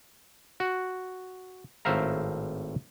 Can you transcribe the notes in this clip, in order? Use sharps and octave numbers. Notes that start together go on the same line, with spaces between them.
F#4
G#1 A2 C5 E5 F5 A#5